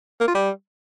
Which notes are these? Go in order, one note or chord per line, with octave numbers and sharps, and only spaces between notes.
A#3
F4
G3